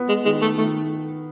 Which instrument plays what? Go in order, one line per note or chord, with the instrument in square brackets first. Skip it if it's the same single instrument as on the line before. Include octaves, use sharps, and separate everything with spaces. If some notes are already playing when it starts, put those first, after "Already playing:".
Already playing: [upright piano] B3
[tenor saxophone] G#3
[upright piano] D#3 [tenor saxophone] G#3
[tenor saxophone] A3
[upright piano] D#3 [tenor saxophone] A3